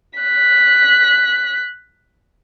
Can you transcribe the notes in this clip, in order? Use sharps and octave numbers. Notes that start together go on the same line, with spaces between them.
F#6 B6